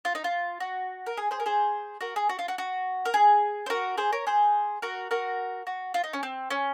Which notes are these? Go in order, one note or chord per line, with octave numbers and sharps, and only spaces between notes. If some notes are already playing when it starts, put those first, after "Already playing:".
F4
D#4
F4
F#4
A#4
G#4
G#4 C5
A#4
G#4 C5
F#4 A#4
G#4
F#4
F4
F#4
F#4
A#4
G#4
C5
F#4 A#4
G#4 C5
A#4 C#5
G#4 C5
F#4 A#4
F#4 A#4
F#4
F4
D#4
C#4
C4
C#4